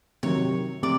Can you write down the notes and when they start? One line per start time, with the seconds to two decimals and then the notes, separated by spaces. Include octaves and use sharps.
0.23 C3 D#3 F#3 C#5
0.83 C3 D5